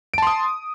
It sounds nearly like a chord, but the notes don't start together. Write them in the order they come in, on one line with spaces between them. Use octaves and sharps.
D7 A5 C6 D#6